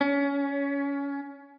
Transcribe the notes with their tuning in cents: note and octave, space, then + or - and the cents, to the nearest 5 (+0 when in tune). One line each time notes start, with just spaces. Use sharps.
C#4 +20